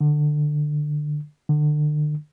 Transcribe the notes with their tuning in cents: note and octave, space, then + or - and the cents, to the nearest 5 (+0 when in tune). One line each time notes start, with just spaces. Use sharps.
D3 +20
D3 +35